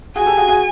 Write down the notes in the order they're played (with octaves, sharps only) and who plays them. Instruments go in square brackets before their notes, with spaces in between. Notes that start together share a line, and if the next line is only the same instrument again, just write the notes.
[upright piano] F#4 G#4 [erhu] G#5
[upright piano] G4 A4
F#4 G#4
F#4 G#4